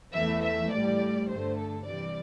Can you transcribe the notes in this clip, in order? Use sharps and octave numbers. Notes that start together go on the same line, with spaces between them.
E2 E3 A3 E5
E5
A2 G3 D5
G2 D3 A3 C5
A4
C3 E3 G3 D5